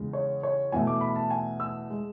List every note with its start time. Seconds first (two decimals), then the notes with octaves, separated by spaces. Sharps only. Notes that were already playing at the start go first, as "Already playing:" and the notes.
Already playing: E2 C#3 G#3
0.13 C#5
0.43 C#5
0.72 E2 B2 A3 G#5
0.87 D6
1.01 B5
1.16 A5
1.30 G#5
1.60 E6
1.90 G#3